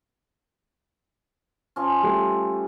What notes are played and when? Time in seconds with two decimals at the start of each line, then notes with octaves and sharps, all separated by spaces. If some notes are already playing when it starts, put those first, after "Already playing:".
1.76 F3 C#4
2.03 G3 A3